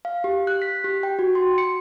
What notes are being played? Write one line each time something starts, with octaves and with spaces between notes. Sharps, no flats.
F5
G4
F#6
B6
G4
G5
F#4
C6
C#7